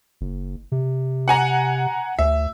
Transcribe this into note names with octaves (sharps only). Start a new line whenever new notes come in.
F#1
C3
F#5 G#5 A#5
D2 E5